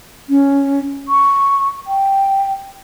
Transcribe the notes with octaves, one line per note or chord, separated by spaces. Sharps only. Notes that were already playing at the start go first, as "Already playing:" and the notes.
C#4
C#6
G5